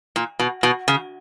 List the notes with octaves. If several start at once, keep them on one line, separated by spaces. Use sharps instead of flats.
A#2
B2
B2
C#3